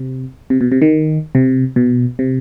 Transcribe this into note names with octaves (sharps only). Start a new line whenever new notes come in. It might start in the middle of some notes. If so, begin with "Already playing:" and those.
Already playing: C3
C3
B2
C3
D#3
C3
B2
C3